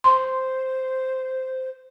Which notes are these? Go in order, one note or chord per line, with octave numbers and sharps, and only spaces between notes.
C5 C6